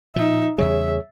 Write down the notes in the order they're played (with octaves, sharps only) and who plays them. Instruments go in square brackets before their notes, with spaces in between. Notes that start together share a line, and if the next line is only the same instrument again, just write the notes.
[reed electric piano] A#2 [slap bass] F3 [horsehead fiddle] D#4 E5
[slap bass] E2 C#3 G3 [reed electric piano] G#4 C#5 [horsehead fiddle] E5